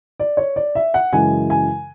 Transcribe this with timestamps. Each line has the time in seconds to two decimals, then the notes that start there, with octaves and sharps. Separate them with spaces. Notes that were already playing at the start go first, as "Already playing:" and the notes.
0.20 D5
0.37 C#5
0.56 D5
0.75 E5
0.94 F#5
1.13 F#2 C#3 E3 G#3 G#5
1.50 G#5